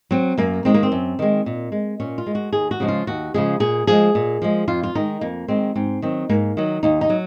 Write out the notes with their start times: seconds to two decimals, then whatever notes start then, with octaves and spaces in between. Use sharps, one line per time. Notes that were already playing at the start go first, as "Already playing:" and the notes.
0.11 F#3 C4
0.37 F#2 A#3
0.65 D#3 G#3 C4
0.74 A#3
0.83 C4
0.92 F#2
1.19 D#3 G#3
1.46 A#2
1.72 G#3
2.00 A#2 C#4
2.18 F4
2.26 G#3
2.35 F#4
2.53 D#2 G#4
2.71 F#4
2.80 C#3 F3 G#3
2.88 F4
3.07 D#2 F#4
3.34 C#3 F3 G#3 G#4
3.60 A#2 G#4
3.87 F3 G#3 G#4
4.15 A#2
4.42 F3 G#3
4.68 F2 F4
4.83 F4
4.95 D#3 G#3 D#4
5.21 F2 A#3
5.48 D#3 G#3 C4
5.75 G#2 C4
6.02 D#3 F#3 C4
6.29 G#2 A#3
6.57 D#3 F#3
6.83 D#2 D#4
7.01 D#4
7.09 F#3